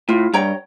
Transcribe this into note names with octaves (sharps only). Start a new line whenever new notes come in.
A2 F4
G2 C#5 G5 A#5